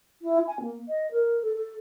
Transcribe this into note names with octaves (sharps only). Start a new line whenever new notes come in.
E4
G#5
A#3
D#5
A#4
A4
A4